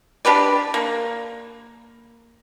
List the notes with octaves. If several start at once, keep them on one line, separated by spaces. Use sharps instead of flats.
D4 G4 B4 D5
A#3